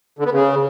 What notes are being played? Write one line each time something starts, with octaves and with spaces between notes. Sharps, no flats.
D3
B3
C#3